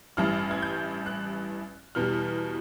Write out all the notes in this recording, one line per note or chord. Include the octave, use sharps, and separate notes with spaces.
A1 G2 E3 F6
G#6
G6
F#6
E2 B2 G3 F6